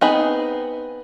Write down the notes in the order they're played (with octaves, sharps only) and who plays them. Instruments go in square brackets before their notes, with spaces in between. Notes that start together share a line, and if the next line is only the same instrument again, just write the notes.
[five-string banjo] B3 C4 D#4 G#4 B5